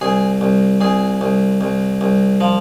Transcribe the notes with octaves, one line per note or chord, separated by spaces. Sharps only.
C2 G#4
C2
C2 G#4
C2
C2
C2
F3